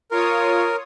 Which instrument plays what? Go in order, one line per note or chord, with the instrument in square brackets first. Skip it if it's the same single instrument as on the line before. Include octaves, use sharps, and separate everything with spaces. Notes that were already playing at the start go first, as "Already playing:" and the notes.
[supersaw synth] F4 C#5 D#6 [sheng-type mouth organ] A#4